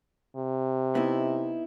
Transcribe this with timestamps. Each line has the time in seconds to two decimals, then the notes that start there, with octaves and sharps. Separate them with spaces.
0.37 C3
0.95 B3 D#4 E4